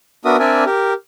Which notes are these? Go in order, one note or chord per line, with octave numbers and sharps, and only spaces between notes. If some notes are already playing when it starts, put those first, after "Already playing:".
B3 D4 F#4 A#4 E5 D#6
C4 D4 A#4 D5 E5 G#5
G4 A#4